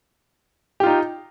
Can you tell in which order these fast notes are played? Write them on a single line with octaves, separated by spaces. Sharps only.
G4 F4 D#4